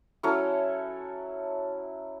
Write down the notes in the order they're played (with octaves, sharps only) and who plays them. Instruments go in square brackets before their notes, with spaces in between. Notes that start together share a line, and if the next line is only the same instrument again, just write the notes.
[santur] F#3 C#4 E4 A4